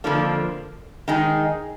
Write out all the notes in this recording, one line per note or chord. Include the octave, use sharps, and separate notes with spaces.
F2 D3 F3 A#3 D4
D#3 G#3 D#4 G#4